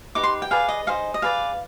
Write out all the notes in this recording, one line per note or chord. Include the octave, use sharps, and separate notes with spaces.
D#4 G4 B4 D6
C6
G5
G#4 B4 D5 F5
D#5
D#4 G#4 C5 D#5 F5
D#5
G#4 B4 D5 F5